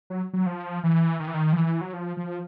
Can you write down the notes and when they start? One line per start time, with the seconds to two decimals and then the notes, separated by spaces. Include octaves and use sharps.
0.10 F#3
0.33 F#3
0.46 F3
0.83 E3
1.20 D#3
1.28 E3
1.34 D#3
1.53 F3
1.57 E3
1.81 F#3
1.93 F3
2.17 F3